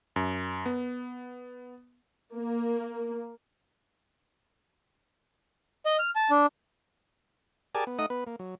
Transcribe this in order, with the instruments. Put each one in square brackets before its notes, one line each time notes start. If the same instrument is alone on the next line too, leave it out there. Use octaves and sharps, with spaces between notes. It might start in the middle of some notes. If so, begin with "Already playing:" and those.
[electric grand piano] F#2
B3
[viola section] A#3
[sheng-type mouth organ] D#5
F6
A5
D4
[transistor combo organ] G4 G#4 A#4 D5 G#5 A5
B3
A3 D#4 D#5 F#5 D#6
B3 B4
A#3
F#3